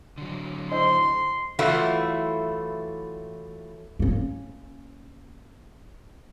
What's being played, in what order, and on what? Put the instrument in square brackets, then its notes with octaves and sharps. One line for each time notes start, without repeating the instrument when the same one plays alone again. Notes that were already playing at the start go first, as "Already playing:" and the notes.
[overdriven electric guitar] D3 F#3
[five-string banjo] E4 C5 D#5 [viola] C6
[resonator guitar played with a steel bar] E3 F#3 A3 E4 F4
[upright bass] A#3 C#4